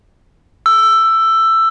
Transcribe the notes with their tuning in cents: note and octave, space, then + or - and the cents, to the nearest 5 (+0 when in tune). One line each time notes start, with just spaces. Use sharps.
E6 +10